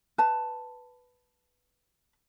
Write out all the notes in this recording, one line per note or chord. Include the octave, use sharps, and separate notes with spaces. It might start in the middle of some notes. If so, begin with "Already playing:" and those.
B4 A5